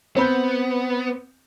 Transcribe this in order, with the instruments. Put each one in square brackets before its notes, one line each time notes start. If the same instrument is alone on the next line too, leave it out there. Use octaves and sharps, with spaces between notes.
[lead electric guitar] B3 [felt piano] C4 B5 G6